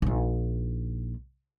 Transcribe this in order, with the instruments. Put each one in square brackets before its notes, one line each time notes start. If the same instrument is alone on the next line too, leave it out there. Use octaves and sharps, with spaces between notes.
[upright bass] A#1 D#4